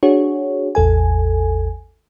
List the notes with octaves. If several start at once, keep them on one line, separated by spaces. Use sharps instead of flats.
D4 F#4 G#4 C#5
A1 E2 A4 G#5